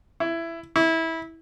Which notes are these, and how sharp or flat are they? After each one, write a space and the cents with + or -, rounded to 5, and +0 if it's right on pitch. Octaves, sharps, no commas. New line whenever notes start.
E4 +15
E4 -20